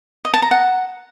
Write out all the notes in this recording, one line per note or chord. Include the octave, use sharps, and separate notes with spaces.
D#5
A5
A#5
F#5